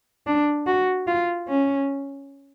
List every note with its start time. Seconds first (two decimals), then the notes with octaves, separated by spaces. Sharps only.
0.27 D4
0.67 F#4
1.07 F4
1.49 C#4